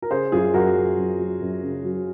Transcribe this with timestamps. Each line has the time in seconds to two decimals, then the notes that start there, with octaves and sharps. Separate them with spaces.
0.02 A#4
0.11 C#3 G#4 C5
0.32 F#2 F4 G#4
0.54 F#2 F#4 A#4
0.76 F#2
0.97 F#2
1.19 F#3
1.41 F#2
1.63 C#3
1.84 F#3